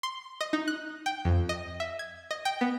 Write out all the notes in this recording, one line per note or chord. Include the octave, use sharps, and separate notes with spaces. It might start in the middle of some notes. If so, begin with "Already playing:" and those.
C6
D#5
D#4
F#6
G5
F2
D#5
E5
G#6
D#5
G5
B3